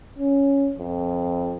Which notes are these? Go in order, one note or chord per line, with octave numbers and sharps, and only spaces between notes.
C#4
F2